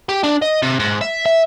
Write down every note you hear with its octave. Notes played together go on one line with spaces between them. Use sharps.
G4
D4
D#5
C3
G#2
E5
E5